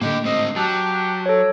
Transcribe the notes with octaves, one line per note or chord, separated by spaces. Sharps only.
A2 D3 A#3 G4 D#5
G#2 C4 D#5
F#3 G4 A5 F#6
A4 C#5